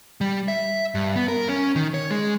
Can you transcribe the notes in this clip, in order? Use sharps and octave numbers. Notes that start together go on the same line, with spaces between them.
G3
E5
G2
B3
A#4
C#4
D#3
C#5
G#3